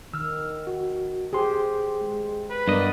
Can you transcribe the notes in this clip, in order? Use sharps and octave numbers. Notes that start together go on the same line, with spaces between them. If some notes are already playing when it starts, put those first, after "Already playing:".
D#3 E6 F6
F#4
G4 G#4 C5 C6
G#3
B4
G2 B3 A#4 D5 D#5